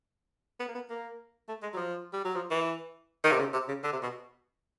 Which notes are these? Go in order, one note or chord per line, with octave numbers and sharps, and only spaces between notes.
B3
A#3
B3
A#3
A3
G#3
F#3
F3
G3
F#3
F3
E3
D#3
C3
C#3
C3
C#3
D3
C3
B2